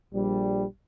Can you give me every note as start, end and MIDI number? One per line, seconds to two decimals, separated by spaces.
0.14 0.64 34
0.14 0.64 55